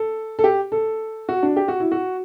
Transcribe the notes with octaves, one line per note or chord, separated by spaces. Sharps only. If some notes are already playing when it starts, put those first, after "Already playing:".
Already playing: A4
A4
G4
A4
F#4
D4
G4
F#4
E4
F#4